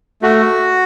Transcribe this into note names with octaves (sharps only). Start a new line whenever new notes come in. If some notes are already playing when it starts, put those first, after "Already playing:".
A3 F#4